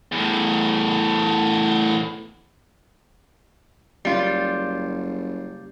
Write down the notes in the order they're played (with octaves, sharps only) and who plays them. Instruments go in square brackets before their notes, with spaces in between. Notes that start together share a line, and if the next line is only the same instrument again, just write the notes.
[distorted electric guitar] E2 A2
[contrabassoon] F#1 [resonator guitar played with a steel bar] G3 F4